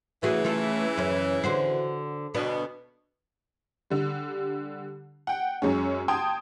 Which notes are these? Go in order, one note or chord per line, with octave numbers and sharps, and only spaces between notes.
C#3 E3 A3 F#4 G#4
A3 F4 A4
F#2 C#4
D3 F#4 C5
D2 B2 B3 D4
D3 G3
F#5 G5
F#2 G#3 C#4
G5 A5 C6 D#6 G#6